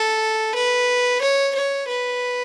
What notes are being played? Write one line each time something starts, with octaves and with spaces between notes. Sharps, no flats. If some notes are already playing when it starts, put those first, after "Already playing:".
Already playing: A4
B4
C#5
C#5
B4